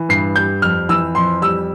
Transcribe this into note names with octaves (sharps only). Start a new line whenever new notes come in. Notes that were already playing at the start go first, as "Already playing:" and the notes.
Already playing: E3
G2 C7
G3 G6
F2 F6
E3 E6
F2 C6
G3 E6